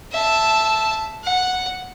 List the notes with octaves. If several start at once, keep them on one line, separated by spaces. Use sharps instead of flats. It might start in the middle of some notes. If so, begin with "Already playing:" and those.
E5 A5
F#5